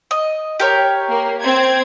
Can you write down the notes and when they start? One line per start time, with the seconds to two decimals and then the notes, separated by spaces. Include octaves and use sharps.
0.11 D#5
0.60 G4 A#4 C#5
1.09 A#3
1.42 C4 G#6